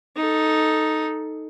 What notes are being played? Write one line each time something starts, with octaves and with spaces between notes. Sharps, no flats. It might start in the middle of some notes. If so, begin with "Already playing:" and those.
D#4 A4